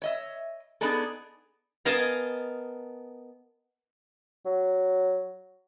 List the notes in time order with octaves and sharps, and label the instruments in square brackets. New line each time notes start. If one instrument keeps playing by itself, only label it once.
[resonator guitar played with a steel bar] C#5 D#5 E5
B3 D4 D#4 G#4 A4
[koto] B3 A#4 D#5 F5 G#5 A5
[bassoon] F#3